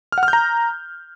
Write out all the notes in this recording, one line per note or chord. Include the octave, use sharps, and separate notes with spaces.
F6
F#5
F6
G6
A#5